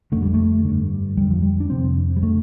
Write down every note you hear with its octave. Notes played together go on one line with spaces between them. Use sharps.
F2 D3 A3
G3
A3
G2 D3
F2 D3 G3
F3
G3
D4
F2 C3 C4
G3
D3 A3